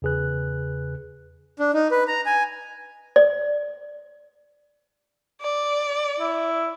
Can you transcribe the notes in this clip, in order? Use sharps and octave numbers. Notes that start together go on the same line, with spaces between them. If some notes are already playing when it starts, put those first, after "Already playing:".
E2 C#3 G#4 B4 F#6
D4
D#4
B4
A#5
G#5
D5
D5
E4